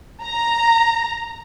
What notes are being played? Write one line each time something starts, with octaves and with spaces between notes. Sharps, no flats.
A#5